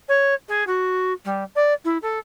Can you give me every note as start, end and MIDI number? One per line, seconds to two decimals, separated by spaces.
0.09 0.34 73
0.49 0.64 68
0.67 1.13 66
1.25 1.44 55
1.56 1.73 74
1.85 1.98 64
2.02 2.19 69